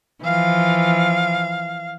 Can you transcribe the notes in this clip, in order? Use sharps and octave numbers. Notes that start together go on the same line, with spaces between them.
E3 F3 F5